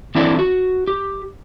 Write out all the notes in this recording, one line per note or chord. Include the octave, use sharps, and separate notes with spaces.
E3 C4 D4 E4 A4 D5
F#4
G4